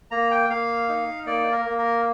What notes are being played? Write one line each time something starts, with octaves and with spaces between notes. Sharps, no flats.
A#3 A#5
G5
A#3 F5
D#4
A#3 D5
A#4
A#3
A#4